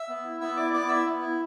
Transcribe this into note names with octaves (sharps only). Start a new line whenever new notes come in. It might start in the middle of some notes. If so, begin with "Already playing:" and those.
Already playing: E5 E6
B3
E4
B3 E5 E6
E4 D5 D6
B3 D5 D6
E4 E5 E6
B3
E4